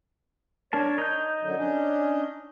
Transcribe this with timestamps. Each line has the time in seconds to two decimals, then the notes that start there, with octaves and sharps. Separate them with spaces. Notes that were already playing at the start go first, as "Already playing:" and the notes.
0.73 D4 A#4 C#5 A5
0.98 D#4 G6
1.42 F#2 D3 F#3
1.56 C#4 D4